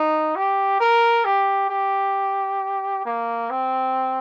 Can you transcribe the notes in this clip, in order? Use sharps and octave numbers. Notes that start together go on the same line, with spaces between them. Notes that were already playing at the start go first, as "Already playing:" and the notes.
Already playing: D#4
G4
A#4
G4
G4
A#3
C4